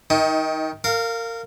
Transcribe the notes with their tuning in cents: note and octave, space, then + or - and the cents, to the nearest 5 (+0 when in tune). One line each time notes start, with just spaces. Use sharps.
D#3 +15 D#4 +35
A#4 -25 F5 +0